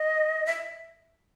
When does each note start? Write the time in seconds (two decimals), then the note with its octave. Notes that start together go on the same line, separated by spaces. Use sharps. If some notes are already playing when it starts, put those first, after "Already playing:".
Already playing: D#5
0.46 E5